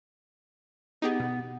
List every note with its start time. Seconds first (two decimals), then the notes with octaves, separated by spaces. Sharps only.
1.02 B3 D#4 G4 G#4
1.20 B2